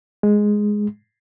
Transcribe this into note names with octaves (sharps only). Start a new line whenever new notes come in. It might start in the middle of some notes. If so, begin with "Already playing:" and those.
G#3